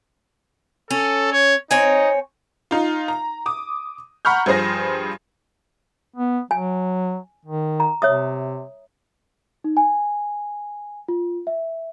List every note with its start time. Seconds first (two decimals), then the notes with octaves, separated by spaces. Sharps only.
0.91 C#4 A4
1.32 C#5
1.71 C4 D#4 C#5 G#5
2.71 D#4 F4
3.08 A#5
3.46 D6 D#6
4.25 F#5 A#5 B5 C#6 F6 G6
4.46 G2 F3 G#4 C5 A#6
6.16 B3
6.51 F#3 G#5
7.45 D#3
7.80 A#5
8.02 C3 C#5 E5 D#6
9.64 D#4
9.77 G#5
11.08 F4
11.47 E5